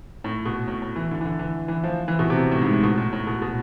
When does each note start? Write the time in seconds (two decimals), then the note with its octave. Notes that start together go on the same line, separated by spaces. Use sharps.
0.24 A2
0.46 B2
0.68 A2
0.82 A2
0.96 E3
1.11 D3
1.21 E3
1.25 D3
1.39 E3
1.68 E3
1.84 F3
2.08 E3
2.19 B2
2.30 C3
2.51 A2
2.62 G#2
2.73 A2
2.84 B2
2.98 A2
3.13 A2
3.27 B2
3.42 B2